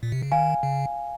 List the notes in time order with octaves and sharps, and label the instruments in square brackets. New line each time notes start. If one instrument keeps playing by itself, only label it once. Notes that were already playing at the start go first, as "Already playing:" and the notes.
[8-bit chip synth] A#2
C3
C#3
[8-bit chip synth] D#3 [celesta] F5 G#5
[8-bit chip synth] C#3